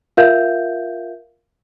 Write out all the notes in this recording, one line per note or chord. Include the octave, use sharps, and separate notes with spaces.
F4 A#4 E5 F5 G6